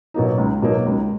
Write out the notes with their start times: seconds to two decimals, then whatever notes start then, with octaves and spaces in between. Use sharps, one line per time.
0.14 B2 F#3 A#3 D#4
0.38 C#2
0.62 B2 F#3 A#3 D#4
0.86 C#2